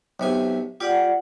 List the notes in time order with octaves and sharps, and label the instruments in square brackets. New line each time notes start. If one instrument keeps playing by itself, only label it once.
[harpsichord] B1 C3 G#5
[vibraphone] F4 D5 F#5 [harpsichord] G4